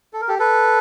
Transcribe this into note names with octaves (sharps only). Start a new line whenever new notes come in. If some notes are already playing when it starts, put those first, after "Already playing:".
A4
A#4
G4 A4
A4 B4